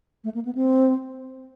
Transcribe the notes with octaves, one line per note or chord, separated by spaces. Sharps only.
A3
A#3
B3
C4